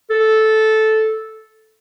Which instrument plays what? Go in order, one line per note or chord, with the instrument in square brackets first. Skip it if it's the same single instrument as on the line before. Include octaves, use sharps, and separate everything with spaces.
[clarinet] A4